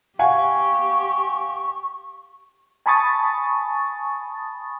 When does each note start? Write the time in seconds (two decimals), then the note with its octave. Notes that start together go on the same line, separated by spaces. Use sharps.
0.19 G4 F5 F#5 G#5 C#6
2.86 G#5 A5 B5 C#6 D#6 A6